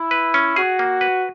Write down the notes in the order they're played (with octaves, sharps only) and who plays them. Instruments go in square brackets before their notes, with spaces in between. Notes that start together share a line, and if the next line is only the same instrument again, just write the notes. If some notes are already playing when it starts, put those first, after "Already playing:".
Already playing: [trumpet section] E4
[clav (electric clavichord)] B4
C#4
[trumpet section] F#4 [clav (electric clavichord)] G#4
[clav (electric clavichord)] A#3
B4